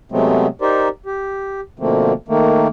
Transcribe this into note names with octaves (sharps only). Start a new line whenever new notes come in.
C3 F#3 G#3 A3 B3 C4
D#4 G4 A#4 C5 D5
G4
B2 D3 F3 A3 A#3 C4
D#3 A3 A#3